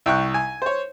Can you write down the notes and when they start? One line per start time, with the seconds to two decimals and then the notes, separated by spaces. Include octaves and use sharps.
0.06 C2 G5 C#6 F#6
0.34 G#5
0.62 C5 C#5